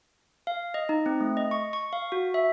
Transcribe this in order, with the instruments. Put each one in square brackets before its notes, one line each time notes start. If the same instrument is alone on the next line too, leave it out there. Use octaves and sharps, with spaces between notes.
[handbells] F5
D#5
D#4
C4
A3
D#5
C#6
C#6
F5
F#4
E5